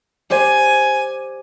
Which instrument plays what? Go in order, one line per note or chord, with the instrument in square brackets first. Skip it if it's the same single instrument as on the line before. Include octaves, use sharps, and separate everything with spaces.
[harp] G4 C5 D5 [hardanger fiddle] G#5